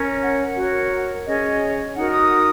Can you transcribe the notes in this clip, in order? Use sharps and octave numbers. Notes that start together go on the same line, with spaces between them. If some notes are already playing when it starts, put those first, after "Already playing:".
Already playing: C#4 A#4 C#5
F#5
F#4 A#4 C#5
C#4 G#4 C#5 D#5
D#4 F#4 A#4 F#5
D#6